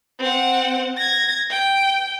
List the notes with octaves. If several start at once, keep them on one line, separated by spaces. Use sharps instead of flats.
C4 F#5
G#6 A#6
G5